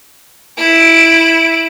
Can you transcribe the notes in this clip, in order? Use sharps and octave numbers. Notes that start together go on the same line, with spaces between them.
E4 D7